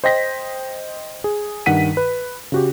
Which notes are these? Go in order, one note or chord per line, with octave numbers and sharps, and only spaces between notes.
C5 D#5 G5 A#6 B6
G#4
G2 D#3 F#5 B6 D#7
B4
C#3 F#4 G4